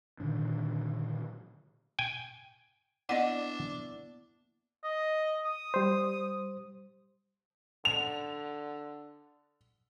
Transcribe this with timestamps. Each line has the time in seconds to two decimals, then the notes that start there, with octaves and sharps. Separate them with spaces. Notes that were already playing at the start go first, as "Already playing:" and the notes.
0.20 A#2 D3 D#3 D4
1.99 G5 G#5
3.09 A#3 B3 D4 E4 D5 D#5 F#5
4.84 D#5
5.45 D#6
5.74 G3 C5
7.85 D3 F7